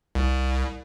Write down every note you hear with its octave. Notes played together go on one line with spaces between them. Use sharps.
C2